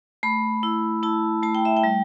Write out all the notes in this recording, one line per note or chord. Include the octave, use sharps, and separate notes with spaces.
A3 B5
E4
E4 A5
A3 A5
G5
E5
G5
G3